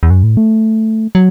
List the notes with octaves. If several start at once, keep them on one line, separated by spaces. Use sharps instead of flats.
E2
F#2
A2
A3
F#3